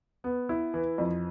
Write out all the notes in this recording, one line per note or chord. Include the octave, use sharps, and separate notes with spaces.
B3
E4
E3
F2